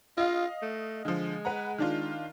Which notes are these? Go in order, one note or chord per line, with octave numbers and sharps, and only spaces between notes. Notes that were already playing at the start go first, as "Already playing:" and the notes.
F4 D#5 F5
A3
D3 F3 G#3
B4 F#5 A#5
D#3 D4 F4